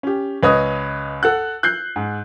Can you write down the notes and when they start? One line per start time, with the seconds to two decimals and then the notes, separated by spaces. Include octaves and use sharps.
0.03 C#4 G4
0.43 C#2 B4 C#5 D#5 D#6
1.23 A4 F#5 F#6
1.63 F#6 G6 C7
1.96 G#2